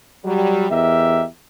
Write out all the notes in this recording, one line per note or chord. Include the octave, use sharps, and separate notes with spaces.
F#3 G3
E2 G4 A#4 D#5 E5